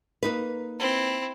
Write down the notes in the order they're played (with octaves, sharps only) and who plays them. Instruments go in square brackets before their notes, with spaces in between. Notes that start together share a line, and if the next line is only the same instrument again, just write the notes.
[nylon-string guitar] A#3 D#4 B4
[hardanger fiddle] C4 E4